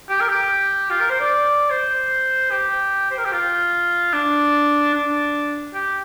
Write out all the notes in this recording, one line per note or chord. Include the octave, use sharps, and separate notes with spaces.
G4
A#4
G4
F4
A#4
C5
D5
C5
G4
C5
A#4
G4
F4
D4
D4
G4